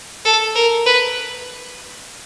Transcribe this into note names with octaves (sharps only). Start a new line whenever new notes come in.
A4
A#4
B4